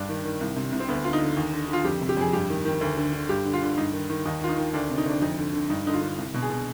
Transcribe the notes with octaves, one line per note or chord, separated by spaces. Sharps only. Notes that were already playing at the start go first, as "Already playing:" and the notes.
Already playing: G2 D4
D#3
D#3
C2
C3
C2
C4
D2 B3
D3 F4
D#4
D3
D#2
D3
D3 F4
F2 G4
C3
G4
F2 G#4
G2 G4
D#3
D#3
D2
D3
D3
G2 G4
D3
F4
D3
G2 D#4
D#3
D#3
D#2 D#4
D#3 F4
D#4
D#3
D2 D4
C3
D#4
D2 D4
F2 D#4
D3
D3
G2 D#4
D3 D#4
F4
D3
C2
B2
G#4
B2